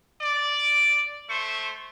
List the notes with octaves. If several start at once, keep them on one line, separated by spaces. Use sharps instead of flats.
D5
A3 C5 C#6